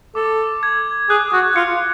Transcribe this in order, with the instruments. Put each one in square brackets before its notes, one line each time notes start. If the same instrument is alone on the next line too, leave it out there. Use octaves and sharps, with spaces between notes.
[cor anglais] A4 [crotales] D6
[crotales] G#6
[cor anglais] G#4 [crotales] F#6
[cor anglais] F#4
[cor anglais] F4 [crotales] C#7